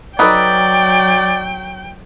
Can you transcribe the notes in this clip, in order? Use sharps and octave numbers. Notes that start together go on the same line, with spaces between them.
F#3 D#4 A4 B4 D5 G5